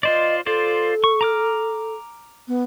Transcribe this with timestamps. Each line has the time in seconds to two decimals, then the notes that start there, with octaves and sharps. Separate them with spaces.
0.03 F4 C5 D5 D#5
0.46 F4 A4 C5 D5
1.04 C#6
1.21 A#5 D6 F6
2.48 B3